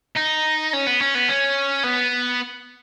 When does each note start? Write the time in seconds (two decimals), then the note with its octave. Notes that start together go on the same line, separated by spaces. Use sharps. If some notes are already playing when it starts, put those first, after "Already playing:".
0.16 D#4
0.73 C#4
0.87 B3
1.01 C#4
1.15 B3
1.29 C#4
1.84 B3